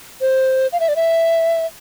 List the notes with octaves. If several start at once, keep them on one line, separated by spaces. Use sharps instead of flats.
C5
F5
E5
D5
E5